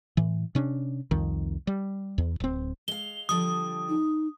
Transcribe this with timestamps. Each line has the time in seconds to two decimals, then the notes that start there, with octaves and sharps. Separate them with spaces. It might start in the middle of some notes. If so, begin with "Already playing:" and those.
0.17 A2 E3
0.55 C3 C#4 D4
1.11 C2 F2 D#3
1.67 G3
2.18 E2
2.40 D1 C4
2.88 G#3 F5 G7
3.29 D3 F3 G3 D#6
3.89 D#4